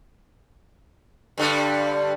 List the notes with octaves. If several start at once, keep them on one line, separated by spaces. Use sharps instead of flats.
G2 D3 G3